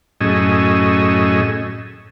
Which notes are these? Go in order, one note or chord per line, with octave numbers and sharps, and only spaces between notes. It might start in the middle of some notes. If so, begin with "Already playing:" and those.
F#2 A2 C#4 G#4 D#5 E6